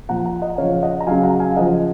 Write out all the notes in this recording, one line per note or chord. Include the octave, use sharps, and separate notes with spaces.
A#2 F3 F#5 A#5
F#5 A#5
D#5 F#5
C#3 F3 C#5 F5
D#5 F#5
A#5
C#3 F#3 F5 G#5
F#5 A#5
F5 G#5
C#3 F3 D#5 F#5